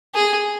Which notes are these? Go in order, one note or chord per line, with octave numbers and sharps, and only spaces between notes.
G#4